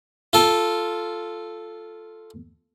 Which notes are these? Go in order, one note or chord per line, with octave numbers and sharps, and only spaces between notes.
F4 A4